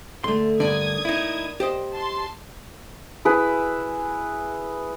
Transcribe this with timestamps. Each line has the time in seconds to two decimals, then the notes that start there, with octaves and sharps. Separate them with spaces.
0.24 D3 A3 C6
0.60 G2 D3 A#3 D5 D#6 G#6
1.05 D#4 E4
1.60 G4 C5 D#5
1.93 A5 C6
3.25 E4 G#4 B4